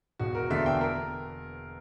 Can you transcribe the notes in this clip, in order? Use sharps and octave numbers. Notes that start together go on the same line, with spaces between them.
E1 F#4
A#4
E2 D3 A#3 E5
G5
A#4